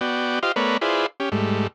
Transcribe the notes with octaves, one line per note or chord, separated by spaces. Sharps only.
B3 F#4 D5 G5
F4 G4 C5 D#5 F5
A3 B3 A#4 B4 C#5 D5
E4 F4 G#4 B4 C5 D5
C#4 G4
G#2 G3 A3